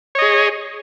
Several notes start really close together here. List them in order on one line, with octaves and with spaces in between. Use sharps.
C#5 D#5 G#4